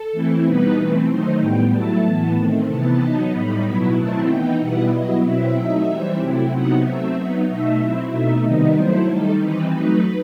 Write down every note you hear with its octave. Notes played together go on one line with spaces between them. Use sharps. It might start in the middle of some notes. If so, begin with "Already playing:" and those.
Already playing: A4
E3 A3 C4 E4
B2 G3 B3 D#4 B4
E3 A3 C4
D#3 F#3 A3 D#4 C5
A2 G3 B3 G5
F#3 A3 E4 A5
A2 E3 B3
D#3 A3 C4
C3 E3 B3 A5
F#3 B3 D#4
A2 G3 D#4 B5
B2 F#3 B3 E4
D#3 F#3 A3 C4 E4 A5
E3 B3 D#4 G5
B2 G3 B3 E4 F#5
F#3 B3 E4 D#5
B2 F#3 C4 E4 E5
F#3 A3 D#4
E3 G3 C4
C3 F#3 A3 C4 E4
C3 F#3 B3 D#4 F#5
F#3 A3 C4 E5
F#3 B3 D#4
B2 A3 D#4 E5
F#3 C4 E4
B2 A3 D#4 E5
C3 D#3 G3 B3 D#4 D#5
F#3 A3 E4 C5
D#3 G3 D#4 A4
E3 G3 C4 D#4 B4
F#3 A3 D#4 B4